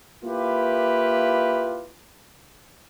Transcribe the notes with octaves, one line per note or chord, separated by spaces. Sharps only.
A#3 E4 F4 G4 B4